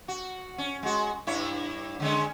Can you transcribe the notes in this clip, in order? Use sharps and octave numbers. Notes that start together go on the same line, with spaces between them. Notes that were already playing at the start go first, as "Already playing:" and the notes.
F#4
C#4
G#3 F#4
G2 E4 C#5
D3 G#3 C#4